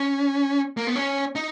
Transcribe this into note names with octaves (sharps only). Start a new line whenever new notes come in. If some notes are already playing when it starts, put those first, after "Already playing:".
Already playing: C#4
A#3
B3
C#4
D#4